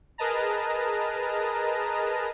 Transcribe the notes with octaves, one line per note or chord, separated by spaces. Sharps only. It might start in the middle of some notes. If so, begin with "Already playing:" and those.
G#4 A#4 B4 D#5 A5 A#5